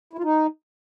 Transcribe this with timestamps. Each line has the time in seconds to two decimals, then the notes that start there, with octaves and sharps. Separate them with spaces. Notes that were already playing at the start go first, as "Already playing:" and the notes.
0.13 E4
0.18 F4
0.24 D#4